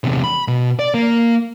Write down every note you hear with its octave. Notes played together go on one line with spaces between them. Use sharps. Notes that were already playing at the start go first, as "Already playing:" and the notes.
E2 C3
B5
B2
D5
A#3